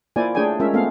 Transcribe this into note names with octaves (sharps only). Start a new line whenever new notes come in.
A#3 E4 F4 C5 D5 G#5
A3 D4 G#4 C#5 G5 G#5
G#3 C#4 F4 A#4 E5
A3 B3 C4 A4 F5